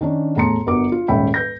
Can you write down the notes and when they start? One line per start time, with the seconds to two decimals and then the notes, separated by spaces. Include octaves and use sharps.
0.01 D#3 C#4 D4
0.36 E2 A2 A5 A#5 C6 C#7
0.66 G1 B3 F#4 A#4 D6
0.92 F4
1.08 D#1 G#2 C#4 E5 G5 B5
1.34 B4 G6 A#6